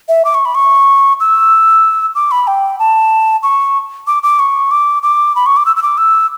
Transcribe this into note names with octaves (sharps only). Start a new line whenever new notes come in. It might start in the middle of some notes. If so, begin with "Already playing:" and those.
E5
D6
C#6
B5
C#6
E6
D6
B5
G5
A5
C#6
D6
D6
C#6
D6
D6
B5
C#6
D6
E6
E6
D6
E6